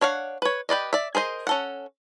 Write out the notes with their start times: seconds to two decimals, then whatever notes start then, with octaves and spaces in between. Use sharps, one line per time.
0.01 D4 C#5 F5 F#5
0.42 B4 C#5
0.69 G4 B4 D5 D#5
0.93 D5 E5
1.15 G#4 A#4 C5 D#5
1.47 C#4 A4 F#5